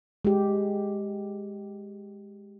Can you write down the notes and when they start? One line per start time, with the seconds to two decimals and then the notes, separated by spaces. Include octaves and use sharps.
0.25 G#3 G4